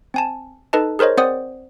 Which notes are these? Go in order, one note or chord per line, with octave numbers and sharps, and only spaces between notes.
C4 G#5 A5
D#4 A4 B4 D#5 A5
G#4 A#4 C5 C#5 D#5
C4 C5 D5 F#5 D#6